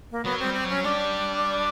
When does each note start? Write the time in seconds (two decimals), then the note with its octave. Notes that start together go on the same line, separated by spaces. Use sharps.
0.11 A#3
0.25 F#3 B3
0.39 G3 C4
0.54 C4
0.64 F#3
0.69 C#4
0.84 G3 D4